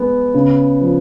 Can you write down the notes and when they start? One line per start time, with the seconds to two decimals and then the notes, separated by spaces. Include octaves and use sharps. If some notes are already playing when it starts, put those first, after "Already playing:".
Already playing: G#3 B3
0.34 C#3
0.81 F3